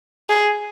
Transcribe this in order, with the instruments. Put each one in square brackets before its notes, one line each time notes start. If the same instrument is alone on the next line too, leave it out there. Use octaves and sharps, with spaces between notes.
[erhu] G#4